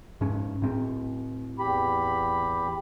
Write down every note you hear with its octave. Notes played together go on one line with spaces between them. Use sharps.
G#2 C#4
A2 C4
E2 G4 B5